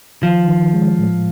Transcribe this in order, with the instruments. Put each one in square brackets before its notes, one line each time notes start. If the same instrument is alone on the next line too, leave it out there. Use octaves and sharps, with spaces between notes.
[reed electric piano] D#3 [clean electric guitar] F3
[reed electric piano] D#3
G#3
A2